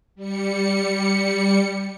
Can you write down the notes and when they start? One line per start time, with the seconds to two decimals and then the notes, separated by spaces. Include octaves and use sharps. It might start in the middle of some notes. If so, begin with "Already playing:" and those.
0.15 G3 C#7